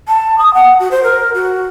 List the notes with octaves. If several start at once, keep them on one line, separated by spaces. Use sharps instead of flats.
A5
D#6
F#5
F#4
C5
A#4
F#4